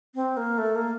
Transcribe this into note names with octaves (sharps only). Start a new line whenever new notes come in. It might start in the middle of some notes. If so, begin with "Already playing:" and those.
C4
A#3
A3
A#3